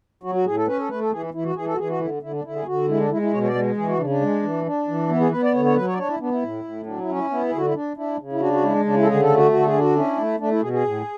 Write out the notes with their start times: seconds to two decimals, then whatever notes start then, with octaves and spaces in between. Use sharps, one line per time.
0.23 F#3 F#4
0.35 F#4
0.45 A2 G#4
0.56 A4
0.67 C#4 B4
0.79 A4
0.90 A3 B4
1.01 A4
1.12 E3 G#4
1.23 E4
1.34 E3 E4
1.44 F#4
1.56 E3 G#4
1.67 A4
1.74 F#4
1.78 E3 G#4
1.89 F#4
2.00 D3 E4
2.22 D3 E4
2.33 D4
2.44 D3 E4
2.56 G#4
2.66 D3 F#4
2.88 G#3 E4
3.00 D4
3.11 G#3 E4
3.22 E4
3.32 B2 C#5
3.43 C#5
3.47 D5
3.55 G#3
3.77 E3 G#4
3.88 F#4
3.99 C#3 D4
4.09 D4
4.21 G#3
4.43 E3
4.65 D4
4.88 E3
5.09 B3 E4
5.20 G#4
5.32 B3 B4
5.43 D5
5.54 D3 C#5
5.65 C#5
5.76 F#3 B4
5.87 C#5
5.93 D5
5.98 D4 C#5
6.09 E4
6.20 B3 D4
6.32 E4
6.42 A2
6.64 A2
6.86 F#3 D4
7.01 E4
7.08 C#4
7.16 E4
7.30 B3 E4
7.49 G#4
7.53 D3 F#4
7.66 E4
7.75 D4
7.97 D4 E4
8.19 C#3
8.32 E4
8.40 D4 F#4
8.53 F#4
8.63 G#3 E4
8.85 C#3 D4
8.96 E4
9.03 A4
9.07 D3 G#4
9.22 A4
9.29 A3
9.37 F#4
9.51 D3 F#4
9.59 A4
9.66 G#4
9.73 D4
9.81 F#4
9.96 C#4 E4
10.18 A3
10.40 A3 D4
10.51 E4
10.62 B2 G#4
10.73 G#4
10.84 A2